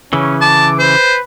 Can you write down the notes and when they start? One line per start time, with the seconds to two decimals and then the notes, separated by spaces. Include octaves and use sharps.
0.13 C#3 E3 C#4
0.41 A5 D6
0.80 B4 C5